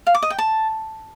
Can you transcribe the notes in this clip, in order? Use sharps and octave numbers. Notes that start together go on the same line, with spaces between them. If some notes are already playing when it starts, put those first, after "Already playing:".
F5
D6
D#5
G5
A5